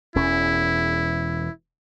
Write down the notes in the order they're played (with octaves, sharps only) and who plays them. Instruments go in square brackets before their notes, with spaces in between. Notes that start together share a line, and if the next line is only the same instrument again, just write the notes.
[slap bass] E1 E2 C#4 [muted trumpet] E4